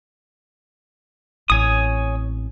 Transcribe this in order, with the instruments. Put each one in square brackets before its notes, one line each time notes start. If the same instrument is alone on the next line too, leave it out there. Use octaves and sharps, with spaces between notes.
[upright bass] A1 C4 [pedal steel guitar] C#5 G#5 D#6